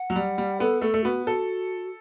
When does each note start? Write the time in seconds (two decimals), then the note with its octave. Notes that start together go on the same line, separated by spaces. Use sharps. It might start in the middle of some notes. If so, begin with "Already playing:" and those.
Already playing: F#5
0.10 F#3
0.16 G3
0.38 G3
0.60 B3 A4
0.82 A3 A4
0.94 A3
1.04 B3 F#4
1.26 F#4 A4